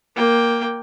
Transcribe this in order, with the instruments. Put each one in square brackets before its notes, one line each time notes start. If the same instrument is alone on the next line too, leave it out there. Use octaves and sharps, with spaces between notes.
[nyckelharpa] A#3 G5